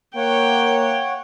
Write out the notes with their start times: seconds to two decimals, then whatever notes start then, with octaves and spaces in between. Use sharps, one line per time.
0.16 A#3 C#5 F#5 G5